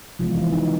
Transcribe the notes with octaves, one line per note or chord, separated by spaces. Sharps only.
C3 E3 F3 G#3 B3 F4
E3 E4
D#3 D#4